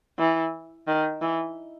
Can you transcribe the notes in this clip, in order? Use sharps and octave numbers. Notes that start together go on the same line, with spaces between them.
E3
D#3
E3